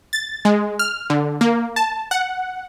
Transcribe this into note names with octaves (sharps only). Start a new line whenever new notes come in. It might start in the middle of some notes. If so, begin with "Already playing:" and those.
A6
G#3
F6
D3
A#3
A5
F#5